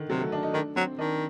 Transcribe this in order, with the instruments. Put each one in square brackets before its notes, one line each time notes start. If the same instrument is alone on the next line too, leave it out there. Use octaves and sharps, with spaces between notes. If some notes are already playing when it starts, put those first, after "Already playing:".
Already playing: [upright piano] D3 D#3
[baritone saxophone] C3 [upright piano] F#3
[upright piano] A3
D4
D#4
[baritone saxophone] D#3 [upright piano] D4
[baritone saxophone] F#3 [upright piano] C4
[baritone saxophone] D#3 [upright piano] D4